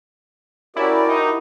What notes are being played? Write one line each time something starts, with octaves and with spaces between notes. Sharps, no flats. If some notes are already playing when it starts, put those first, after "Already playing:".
C#4 E4 F#4 G4 A#4 D5
D#4